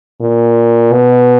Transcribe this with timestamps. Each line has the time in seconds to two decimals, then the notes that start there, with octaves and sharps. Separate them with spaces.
0.21 A#2
0.92 B2